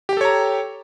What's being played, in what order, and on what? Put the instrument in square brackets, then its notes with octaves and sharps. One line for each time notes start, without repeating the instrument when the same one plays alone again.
[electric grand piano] G4
G5
A4
C#5
A#5